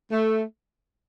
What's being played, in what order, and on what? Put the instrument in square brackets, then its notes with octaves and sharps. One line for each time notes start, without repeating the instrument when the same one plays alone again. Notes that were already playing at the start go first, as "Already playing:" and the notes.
[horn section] A3